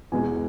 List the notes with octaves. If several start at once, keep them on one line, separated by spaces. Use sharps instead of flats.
E2 B2 G#3 G#5